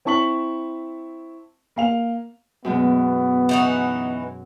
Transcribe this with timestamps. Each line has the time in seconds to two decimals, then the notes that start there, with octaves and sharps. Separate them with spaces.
0.05 C4 E4 A5 C#6 B6 F#7
1.76 A#3 F5 F7
2.65 F#2 B2 G#3 B3
3.49 E3 D#4 F#4